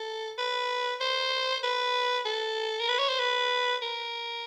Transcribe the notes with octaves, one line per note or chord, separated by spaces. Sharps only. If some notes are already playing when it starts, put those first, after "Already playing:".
Already playing: A4
B4
C5
B4
A4
A#4
B4
C#5
C5
B4
A#4